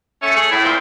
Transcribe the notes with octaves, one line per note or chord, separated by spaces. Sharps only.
A3 C#4
G#4
A2 E4
A#2 C4